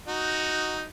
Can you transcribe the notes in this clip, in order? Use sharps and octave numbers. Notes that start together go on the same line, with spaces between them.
D#4 F#4